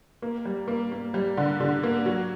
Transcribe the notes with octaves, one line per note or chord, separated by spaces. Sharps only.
A#3
G3
A#3
A#3
G3
D3
D3
A#3
F#3